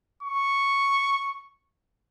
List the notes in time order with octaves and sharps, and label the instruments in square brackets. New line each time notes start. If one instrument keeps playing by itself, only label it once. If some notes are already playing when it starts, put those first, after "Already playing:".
[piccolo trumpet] C#6